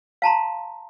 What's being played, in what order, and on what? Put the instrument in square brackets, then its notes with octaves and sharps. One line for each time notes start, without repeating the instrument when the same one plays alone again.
[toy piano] F5 A5 A#5 C6